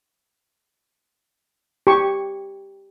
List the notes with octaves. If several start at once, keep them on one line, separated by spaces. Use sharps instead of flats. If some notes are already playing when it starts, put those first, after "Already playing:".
G4 C#6